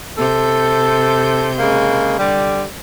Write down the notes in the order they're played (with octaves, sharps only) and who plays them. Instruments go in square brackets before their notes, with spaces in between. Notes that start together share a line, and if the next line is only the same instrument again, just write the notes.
[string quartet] C3 G6 [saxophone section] A4
[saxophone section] C#3 G#3 A#3
D3 G3